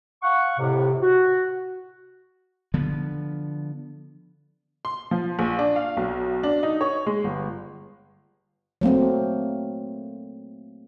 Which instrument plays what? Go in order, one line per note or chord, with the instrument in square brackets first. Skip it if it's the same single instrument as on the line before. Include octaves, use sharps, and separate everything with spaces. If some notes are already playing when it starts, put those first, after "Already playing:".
[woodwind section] F5 F#5 C#6
F2 A2 C3
F#4
[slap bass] D3 F3 B3
[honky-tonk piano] C6
F3
A#1
D4
F5
B1
D4
D#4
C#5
G#3
G1
[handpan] F#3 A3 A#3 C4